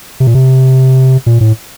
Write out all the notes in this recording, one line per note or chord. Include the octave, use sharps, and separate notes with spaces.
C3
A#2
C3
A#2
A2